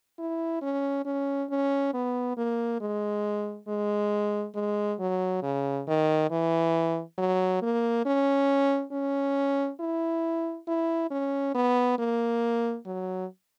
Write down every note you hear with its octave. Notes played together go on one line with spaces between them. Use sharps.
E4
C#4
C#4
C#4
B3
A#3
G#3
G#3
G#3
F#3
C#3
D#3
E3
F#3
A#3
C#4
C#4
E4
E4
C#4
B3
A#3
F#3